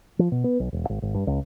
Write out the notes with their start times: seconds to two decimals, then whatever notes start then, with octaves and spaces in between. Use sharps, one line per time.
0.19 F3
0.32 B2
0.44 B3
0.60 B1
0.73 E1
0.90 G#1
1.02 G#1
1.15 G2
1.27 C#2